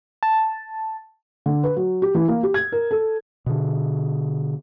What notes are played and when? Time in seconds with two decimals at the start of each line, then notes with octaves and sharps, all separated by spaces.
0.23 A5
1.46 D3
1.64 B4
1.76 F#3
2.02 G4
2.15 E3
2.28 A#3
2.43 G4
2.54 G#6
2.72 A#4
2.91 A4
3.46 B2 D3